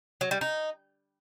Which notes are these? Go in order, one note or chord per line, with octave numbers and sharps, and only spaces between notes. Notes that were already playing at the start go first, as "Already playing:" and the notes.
F#3
G3
D#4